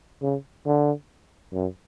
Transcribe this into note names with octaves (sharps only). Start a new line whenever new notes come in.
C#3
D3
F#2